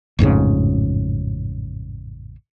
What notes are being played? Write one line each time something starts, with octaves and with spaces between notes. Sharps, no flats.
A1 F2 G#2 C#3